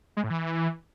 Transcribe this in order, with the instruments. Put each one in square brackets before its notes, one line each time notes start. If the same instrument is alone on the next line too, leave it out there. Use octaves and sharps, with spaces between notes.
[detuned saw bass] G#3
A2
E3